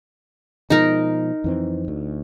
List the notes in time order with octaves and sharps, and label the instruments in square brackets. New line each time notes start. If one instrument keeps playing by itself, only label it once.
[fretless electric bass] B2 F3 G#3 [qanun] D#4 A#4
[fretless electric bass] F2 E3 C4
D2